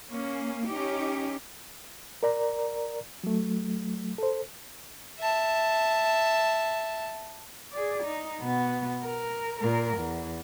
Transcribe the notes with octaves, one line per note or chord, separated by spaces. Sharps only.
A#3 C#4
C#4 D#4 G4
A#4 D5 A#5
F#3 A3
A4 C5
E5 A5
G#4 D5
D#4
B2 B3
A#4
A#2 A#4
E2